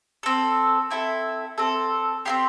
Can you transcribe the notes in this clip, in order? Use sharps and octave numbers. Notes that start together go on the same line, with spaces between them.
C4 A4
C4 E4 A4
C4 A4
C4 E4 G4 C6